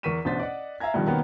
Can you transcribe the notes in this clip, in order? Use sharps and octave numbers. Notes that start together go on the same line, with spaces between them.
E2 A#4 C#6 B6 D#7 E7
A1 B2 D4 C5 A6 B6
D5 D#5 F#5
E5 F5 G#5 A#5 G#6
G2 B2 D3 D#3 F3 G3
B2 D#3 A#3 B3 C#4